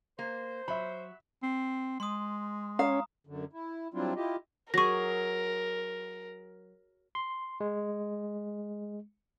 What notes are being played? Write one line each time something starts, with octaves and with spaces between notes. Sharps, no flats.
A#3 C5
F#3 E5 B5
C4
G#3 C6 D#6
C#4 F5 A#5 D#6
F#2 D3
E4
F#3 G3 C4 D4 E4 F4
E4 F4 G4 D#5
F#3 G#4 A#4 C#6 A#6
C6
G#3